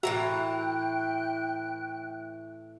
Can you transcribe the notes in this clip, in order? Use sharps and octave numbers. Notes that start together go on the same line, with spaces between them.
A2 E3 F#4 E5 G5 A#5 F#6